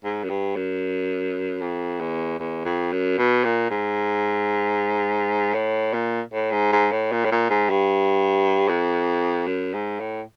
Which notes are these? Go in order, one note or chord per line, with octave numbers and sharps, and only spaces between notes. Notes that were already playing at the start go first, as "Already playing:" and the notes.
G#2
F#2
G2
F#2
F2
E2
E2
F2
F#2
B2
A#2
G#2
A2
A#2
A2
G#2
G#2
A2
A#2
A2
A#2
G#2
G2
F2
F#2
G#2
A2